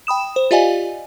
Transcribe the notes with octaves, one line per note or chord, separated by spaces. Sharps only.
G5 B5 D#6 E7
C5
F4 G4 D5 D#5 F5 G#5